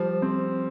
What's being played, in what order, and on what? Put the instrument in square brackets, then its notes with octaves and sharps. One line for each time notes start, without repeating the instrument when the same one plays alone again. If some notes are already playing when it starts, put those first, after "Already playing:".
Already playing: [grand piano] F3 [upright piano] G3
[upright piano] C4